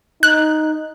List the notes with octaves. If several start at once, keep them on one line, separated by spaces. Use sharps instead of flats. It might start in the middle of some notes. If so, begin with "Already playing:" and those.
D#4 F#6